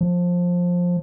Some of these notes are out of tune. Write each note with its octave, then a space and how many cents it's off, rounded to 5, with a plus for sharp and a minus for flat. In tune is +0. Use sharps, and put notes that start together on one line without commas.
F3 +15